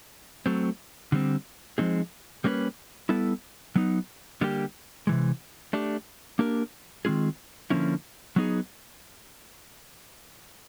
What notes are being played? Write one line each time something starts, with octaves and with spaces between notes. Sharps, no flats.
F#3 A3 C4
D3 G3 C4
F3 G#3 C4 D#4 G#4
G3 A#3 C#4 F#4 B4
G3 B3 E4 A4
F#3 B3 D#4
D3 G3 A#3 D#4 G4
C3 E3 G#3
A3 D4 G4
A#3 D4 G4 A#4
D#3 G#3 C4 F4 G#4
D3 F3 A#3 C#4 E4
F#3 B3 D#4 G#4